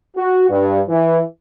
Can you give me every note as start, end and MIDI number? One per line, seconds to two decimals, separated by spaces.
0.17 0.47 66
0.50 0.80 43
0.89 1.19 52